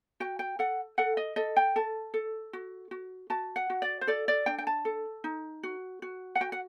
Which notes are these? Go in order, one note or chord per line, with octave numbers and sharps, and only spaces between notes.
F#4 G5
G5
A4 F#5
A4 F#5
D#5
A4 D#5
G5
A4 A5
A4
F#4
F#4
F#4 A5
F#5
F#4
D5
C5
A4 D5
D5
D4 G5
G5
A5
A4
D#4
F#4
F#4
F#5
F#4 G5
F#5